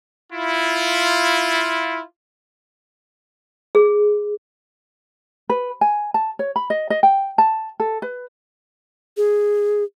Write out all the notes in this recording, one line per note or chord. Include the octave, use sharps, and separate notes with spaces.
E4 F4
G#4
B4
G#5
A5
C#5
B5
D#5
D#5
G5
A5
A4
B4
G#4